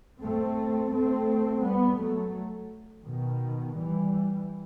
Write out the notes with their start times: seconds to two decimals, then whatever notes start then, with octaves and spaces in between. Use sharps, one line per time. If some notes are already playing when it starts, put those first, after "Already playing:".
0.21 A3 C4
0.92 A3 C4
1.62 G3 B3
1.98 F#3 A3
3.04 B2 D#3
3.75 E3 G3